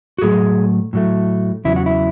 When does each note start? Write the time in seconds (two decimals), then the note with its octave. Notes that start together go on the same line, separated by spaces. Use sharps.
0.18 F#4
0.21 A2 F#3 A3 G#4
0.93 A2 F#3 A3
1.65 E2 C#3 F#3 E4
1.76 F#4
1.86 E4